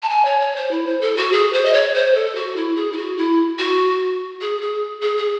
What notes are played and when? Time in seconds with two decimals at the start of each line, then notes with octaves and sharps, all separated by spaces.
0.02 A5
0.09 G#5
0.25 C#5
0.40 C#5
0.56 C5
0.71 E4
0.86 C5
1.01 A4
1.17 F#4
1.32 G#4
1.53 C5
1.65 D#5
1.73 C#5
1.94 C5
2.15 A4
2.35 F#4
2.56 E4
2.76 G#4
2.92 E4
2.96 F#4
3.17 E4
3.59 F#4
4.41 G#4
4.61 G#4
5.02 G#4
5.17 G#4